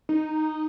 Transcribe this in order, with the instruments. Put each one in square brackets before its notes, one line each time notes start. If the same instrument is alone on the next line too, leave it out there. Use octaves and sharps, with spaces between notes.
[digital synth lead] D#4